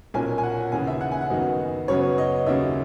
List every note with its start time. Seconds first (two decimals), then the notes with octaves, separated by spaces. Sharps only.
0.14 B1 A#2 A#3 C#4 G#5
0.38 G#5
0.43 F#5
0.72 D#2 C#3 E3 G#5
0.87 E5
1.01 F#5
1.12 G#5
1.21 F#5
1.30 F#2 D#3 F#3 B3 D#5
1.88 F#2 C#3 F#3 B3 C#5
2.18 D#5
2.46 D#2 C#3 F#3 E5